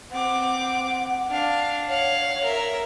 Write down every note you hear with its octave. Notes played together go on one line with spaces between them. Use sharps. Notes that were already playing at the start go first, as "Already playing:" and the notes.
C4 F#5 D6
D4 F5
C#5 F5 F#5
A#4 E5